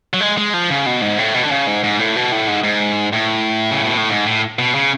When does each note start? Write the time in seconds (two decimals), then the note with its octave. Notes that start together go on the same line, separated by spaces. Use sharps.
0.13 F#3
0.21 G#3
0.38 G#3
0.54 F3
0.70 C#3
0.86 B2
1.02 G#2
1.18 A2
1.34 B2
1.43 D3
1.51 C#3
1.67 G#2
1.84 G#2
1.99 A2
2.16 B2
2.32 A2
2.48 G#2
2.63 G#2
3.13 A2
3.71 C#3
3.84 B2
3.97 A2
4.10 G#2
4.26 A2
4.59 B2
4.75 C#3